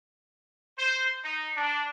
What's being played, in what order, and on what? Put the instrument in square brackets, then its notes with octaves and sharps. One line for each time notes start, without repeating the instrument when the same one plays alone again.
[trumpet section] C5
D#4
D4